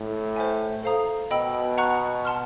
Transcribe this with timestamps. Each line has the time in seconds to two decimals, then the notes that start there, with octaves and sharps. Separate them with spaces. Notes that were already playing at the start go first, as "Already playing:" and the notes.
Already playing: A2
0.36 C5 E5 G#5
0.83 A4 C5 F5 A#5 D#6
1.31 B2 D#5 G5 B5 E6
1.78 F#5 A#5 C#6 F#6
2.25 F#5 A5 C6 F6